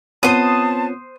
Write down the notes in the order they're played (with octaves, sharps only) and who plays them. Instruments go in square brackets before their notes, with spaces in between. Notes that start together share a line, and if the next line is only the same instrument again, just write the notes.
[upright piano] B3 D#7 [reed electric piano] C4 F4 C#5 [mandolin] C5 D#6 [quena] A5